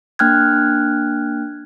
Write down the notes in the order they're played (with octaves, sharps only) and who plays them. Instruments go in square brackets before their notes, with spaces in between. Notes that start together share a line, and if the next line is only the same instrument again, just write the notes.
[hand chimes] A#3 D4 G5 F6 F#6 G#6